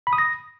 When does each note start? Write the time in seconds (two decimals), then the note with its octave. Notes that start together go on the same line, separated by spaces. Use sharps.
0.07 B5
0.13 D#6
0.18 A#6